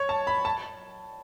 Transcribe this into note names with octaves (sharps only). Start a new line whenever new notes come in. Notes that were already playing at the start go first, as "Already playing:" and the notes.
Already playing: C#5
A5
B5
A5